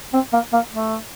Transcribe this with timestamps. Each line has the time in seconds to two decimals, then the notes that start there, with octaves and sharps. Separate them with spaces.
0.14 C4
0.33 A#3
0.53 A#3
0.72 A3